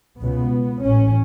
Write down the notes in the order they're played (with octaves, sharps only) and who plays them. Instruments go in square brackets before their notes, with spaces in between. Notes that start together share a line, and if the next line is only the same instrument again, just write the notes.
[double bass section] C#2 B2 B3
A1 A2 C#4